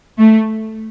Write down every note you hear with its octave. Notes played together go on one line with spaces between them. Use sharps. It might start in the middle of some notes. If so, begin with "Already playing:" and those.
A3